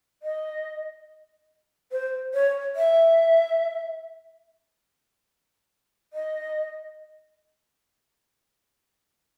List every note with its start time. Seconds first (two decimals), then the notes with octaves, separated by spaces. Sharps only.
0.23 D#5
1.92 C5
2.34 C#5
2.76 E5
6.13 D#5